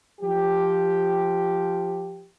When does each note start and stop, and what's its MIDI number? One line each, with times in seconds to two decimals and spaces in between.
0.21 2.28 53
0.21 2.28 67